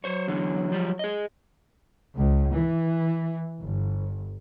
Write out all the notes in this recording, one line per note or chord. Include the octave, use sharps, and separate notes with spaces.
F#3 C5 C#5
E2 D3
F3 G3
G#4 D#5
C#2
E3
G1